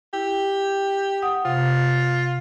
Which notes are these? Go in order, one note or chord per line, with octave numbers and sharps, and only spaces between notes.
E4 G4
F#5 D#6
C3 F4